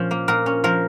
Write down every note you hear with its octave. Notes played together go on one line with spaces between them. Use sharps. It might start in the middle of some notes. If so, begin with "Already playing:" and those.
Already playing: A#2 F3 C#4
A#3
A#2 A#4
C#4
F3 A#4